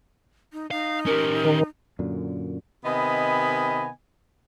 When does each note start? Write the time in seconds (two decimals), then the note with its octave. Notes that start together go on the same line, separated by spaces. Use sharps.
0.53 D#4
0.71 D#4 F5
1.06 C#4 G4 A#4
1.45 D#3
1.99 F#2 A#2 D3
2.85 C3 D#3 B3 D#5 G#5 B5